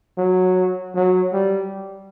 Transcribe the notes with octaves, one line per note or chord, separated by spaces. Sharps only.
F#3
F#3
G3